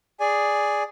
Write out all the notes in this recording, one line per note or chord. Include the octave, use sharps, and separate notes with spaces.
G#4 D5 G#5